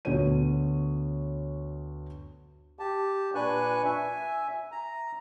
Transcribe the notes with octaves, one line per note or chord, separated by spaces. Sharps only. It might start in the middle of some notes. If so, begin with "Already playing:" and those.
D2 B3 F#4 C#5 D#7
G4 A5
A#2 D4 B4 G#5 C#6 F#6
E5 G#5
A#5